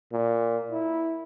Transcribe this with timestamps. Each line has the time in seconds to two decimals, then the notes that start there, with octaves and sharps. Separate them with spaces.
0.13 A#2
0.72 E4